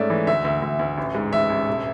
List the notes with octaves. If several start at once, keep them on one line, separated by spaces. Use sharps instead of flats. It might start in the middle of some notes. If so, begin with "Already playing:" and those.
Already playing: G#2 A3 C#4 D5 E5
E3
D2 E5
D2
D2
D2
A1
G#2
A1 E5
A1
E1